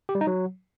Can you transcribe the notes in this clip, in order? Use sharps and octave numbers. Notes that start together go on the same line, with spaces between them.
G4
G3
D#4
F#3